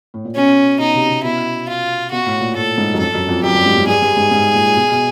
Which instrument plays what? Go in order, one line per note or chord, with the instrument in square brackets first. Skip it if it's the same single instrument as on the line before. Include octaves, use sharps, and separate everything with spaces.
[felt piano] A2
A#2
[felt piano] B2 [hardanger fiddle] C#4
[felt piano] B2 [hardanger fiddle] D#4
[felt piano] C3
C3
[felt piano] B2 [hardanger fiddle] E4
[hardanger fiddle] F4
[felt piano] B2 [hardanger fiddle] F#4
[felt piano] A2
A#2
[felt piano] A2 [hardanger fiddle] A4
[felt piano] G#2
F#2
[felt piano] F2 [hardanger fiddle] A4
[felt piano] F#2
F2
[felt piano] F#2 [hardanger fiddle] G4
[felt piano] G2
G#2
G#2
[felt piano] G2 [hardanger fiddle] G#4
[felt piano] G2
G#2
G#2
A#2
B2
B2